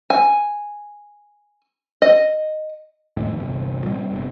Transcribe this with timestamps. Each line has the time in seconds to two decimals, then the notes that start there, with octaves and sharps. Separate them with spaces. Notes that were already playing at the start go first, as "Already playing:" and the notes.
0.10 G#5
2.02 D#5
3.17 D1 F2 A2 D#3
3.36 G1 C2
3.84 A#2 G3 C4
4.10 G1 C3